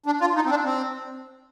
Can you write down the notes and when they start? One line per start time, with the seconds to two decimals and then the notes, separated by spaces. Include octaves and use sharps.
0.06 D4
0.21 F4
0.36 D#4
0.46 C4
0.50 D4
0.65 C4